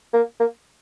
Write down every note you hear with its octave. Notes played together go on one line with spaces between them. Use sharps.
A#3
A#3